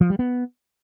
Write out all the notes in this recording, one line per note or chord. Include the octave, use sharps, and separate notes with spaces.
F3
G3
B3